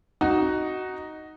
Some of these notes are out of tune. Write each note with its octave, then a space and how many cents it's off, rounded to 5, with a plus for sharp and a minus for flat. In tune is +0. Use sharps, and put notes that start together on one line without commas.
D#4 +0 F#4 +10